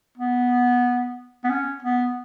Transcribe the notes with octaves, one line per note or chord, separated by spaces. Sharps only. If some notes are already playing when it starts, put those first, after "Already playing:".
B3
B3
C#4
B3